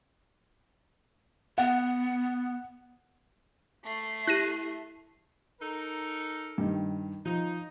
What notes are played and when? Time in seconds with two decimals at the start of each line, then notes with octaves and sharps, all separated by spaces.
1.58 B3 F#5
3.85 A3 C7
4.27 E4 G4 F#6 A#6 D#7
5.61 D#4 A4 A#4
6.58 G2 D#3
7.25 F3 D#4